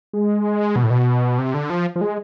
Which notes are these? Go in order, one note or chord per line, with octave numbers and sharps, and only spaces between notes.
G#3
B2
A2
B2
C3
D3
F3
F3
G#3